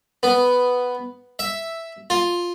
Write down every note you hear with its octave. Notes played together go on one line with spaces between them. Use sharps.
B3
E5
F4